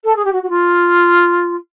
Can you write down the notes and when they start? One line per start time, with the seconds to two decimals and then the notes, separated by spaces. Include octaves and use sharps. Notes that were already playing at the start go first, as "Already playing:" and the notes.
0.04 A4
0.16 G#4
0.24 G4
0.32 F#4
0.43 F#4
0.49 F4